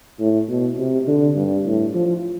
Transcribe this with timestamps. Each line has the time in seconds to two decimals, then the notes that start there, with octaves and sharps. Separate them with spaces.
0.20 A2
0.49 B2
0.78 C3
1.07 D3
1.36 G2
1.65 A2
1.94 F3